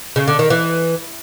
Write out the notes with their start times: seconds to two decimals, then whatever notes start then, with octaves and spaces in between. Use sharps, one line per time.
0.16 C#3
0.28 D3
0.39 D#3
0.50 E3